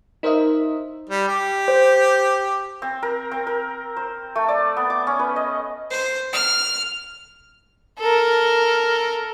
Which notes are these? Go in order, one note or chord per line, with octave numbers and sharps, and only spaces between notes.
D#4 A#4 C5 D#5 E5
G3
G4
C5
C4
A#4
C4
A#4
C5
A3
D5
B3
D6
C#4
B4
D#5
C5
F6
A4 A#4